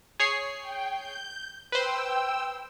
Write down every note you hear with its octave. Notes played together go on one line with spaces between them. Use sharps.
G#4 C#5 C7
G5
G6
B4 C5 G5 E6